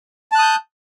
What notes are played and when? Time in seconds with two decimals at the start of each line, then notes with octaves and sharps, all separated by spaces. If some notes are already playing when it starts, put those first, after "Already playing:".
0.32 A5
0.35 F#6
0.39 D#6
0.42 G6